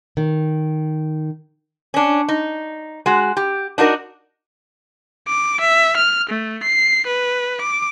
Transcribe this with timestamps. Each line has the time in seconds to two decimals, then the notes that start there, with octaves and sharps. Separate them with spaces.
0.17 D#3
1.94 C#4 D4
2.29 D#4
3.06 G#3 F#4
3.37 G4
3.78 D4 D#4 F#4 A#4
5.28 D6
5.60 E5
5.97 F6
6.29 A3
6.63 C7
7.06 B4
7.61 D6